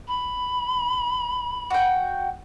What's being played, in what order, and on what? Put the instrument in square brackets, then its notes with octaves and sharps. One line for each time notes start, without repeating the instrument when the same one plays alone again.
[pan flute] B5
[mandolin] F#4 G5